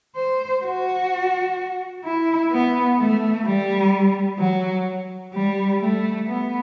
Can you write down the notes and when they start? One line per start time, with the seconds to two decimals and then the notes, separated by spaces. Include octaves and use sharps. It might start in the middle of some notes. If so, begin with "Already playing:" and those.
0.16 C5
0.63 F#4
2.04 E4
2.52 B3
2.98 A3
3.45 G3
4.39 F#3
5.33 G3
5.81 A3
6.27 B3